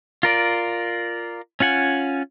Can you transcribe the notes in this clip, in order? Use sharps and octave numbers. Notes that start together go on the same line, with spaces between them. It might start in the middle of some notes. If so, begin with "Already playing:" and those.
F4 A#4 D5
C#4 F4 F#5 G#5